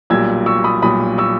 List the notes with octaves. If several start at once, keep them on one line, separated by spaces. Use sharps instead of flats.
B1 A#2 G3 E6 G#6
C#6 E6
B5 D#6
B1 A#2 G3 B5 D#6
C#6 E6